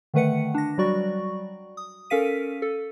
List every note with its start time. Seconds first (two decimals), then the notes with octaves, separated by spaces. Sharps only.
0.14 D3 D#3 A3 B4 F#5 C#7
0.54 D4 A#6
0.78 F#3 G3 F#4 D5 C#6
1.77 D#6
2.10 C#4 A4 A#4 F5 B6 D#7
2.62 A4